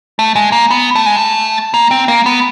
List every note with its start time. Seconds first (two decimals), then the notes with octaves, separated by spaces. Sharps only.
0.19 A3
0.35 G#3
0.52 A#3
0.70 B3
0.95 A3
1.06 G#3
1.17 A3
1.74 A#3
1.91 C4
2.08 A#3
2.26 B3